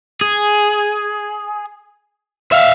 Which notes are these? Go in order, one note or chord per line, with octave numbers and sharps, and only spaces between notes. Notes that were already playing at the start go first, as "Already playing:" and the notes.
G#4
E5 F5